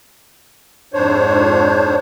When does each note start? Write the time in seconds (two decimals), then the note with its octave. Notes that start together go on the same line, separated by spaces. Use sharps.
0.94 F2 G#2 D4 C5 C#5